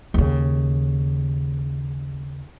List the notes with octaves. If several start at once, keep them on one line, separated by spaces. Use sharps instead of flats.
D#2 C#3